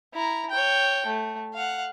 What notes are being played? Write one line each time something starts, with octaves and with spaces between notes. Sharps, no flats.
E4 A#5
C#5 G5
A3
F5 F#5